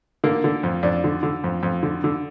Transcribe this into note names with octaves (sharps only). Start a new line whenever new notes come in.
D3 A#3
D3
F2
F2 D4
D3
D3
F2
F2
D3
D3